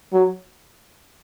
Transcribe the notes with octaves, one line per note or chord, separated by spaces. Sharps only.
F#3